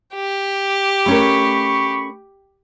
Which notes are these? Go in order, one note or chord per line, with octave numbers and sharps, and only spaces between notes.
G4
A3 C#4 A#4 B5 C#6